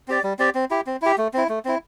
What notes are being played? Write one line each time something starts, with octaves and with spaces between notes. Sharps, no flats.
C4 G4 D5
G3
C4 G4 D5
C4
E4 G4
C4
E4 G4
A3
C4 E4
A3
C4 E4